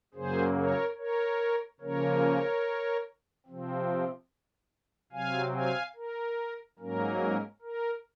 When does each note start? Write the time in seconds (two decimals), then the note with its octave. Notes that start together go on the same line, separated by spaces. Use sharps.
0.14 F#2 C#3 F#3 A#3 G#4 C5
0.56 A#4 C#5
0.97 A#4 C#5
1.80 C#3 F3 A#3 C#4 A#4 C#5
3.46 C3 F3 C4
5.12 C3 F#3 C4 F5 G#5
5.54 F5 G#5
5.95 A#4
6.79 G#2 F#3 A#3 C#4 A#4
7.61 A#4